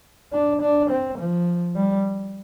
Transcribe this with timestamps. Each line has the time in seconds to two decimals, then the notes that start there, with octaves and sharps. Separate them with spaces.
0.33 D4
0.62 D4
0.90 C4
1.19 F3
1.76 G3